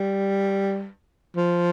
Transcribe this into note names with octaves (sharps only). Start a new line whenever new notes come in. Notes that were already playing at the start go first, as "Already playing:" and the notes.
Already playing: G3
F3